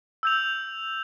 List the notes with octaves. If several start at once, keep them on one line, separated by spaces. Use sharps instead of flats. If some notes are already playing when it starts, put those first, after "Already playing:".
E6 G6 F7